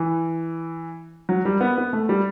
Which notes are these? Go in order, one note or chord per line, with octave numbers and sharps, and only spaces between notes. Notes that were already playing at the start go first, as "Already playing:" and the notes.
Already playing: E3
F#3
G3
B3
B3
A3
G3